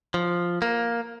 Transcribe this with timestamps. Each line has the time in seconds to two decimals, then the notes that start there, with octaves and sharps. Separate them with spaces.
0.14 F3
0.62 A#3